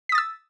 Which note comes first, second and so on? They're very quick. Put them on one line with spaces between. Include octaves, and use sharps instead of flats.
B6 D#6 A6 E6